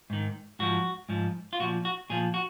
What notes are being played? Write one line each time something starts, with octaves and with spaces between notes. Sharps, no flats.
G#2 D#3
G#2 F3 F#4
G#2 F3
F4
A#2 F3 F#4
F#4
A#2 F3 G#4
F#4